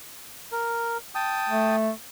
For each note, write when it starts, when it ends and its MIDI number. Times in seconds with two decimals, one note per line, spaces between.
0.52 0.97 70
1.15 1.76 79
1.15 1.76 81
1.15 1.76 87
1.49 1.91 57